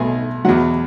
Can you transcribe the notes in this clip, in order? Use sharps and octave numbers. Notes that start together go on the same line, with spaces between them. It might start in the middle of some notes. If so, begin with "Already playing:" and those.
Already playing: B1 B2 A3 G#4 G#5
E2 B2 F#3 F#4 F#5